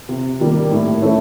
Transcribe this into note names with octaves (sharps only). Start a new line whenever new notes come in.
C3
D#3 G3 A#3
A2
E3 A3 C#4 E4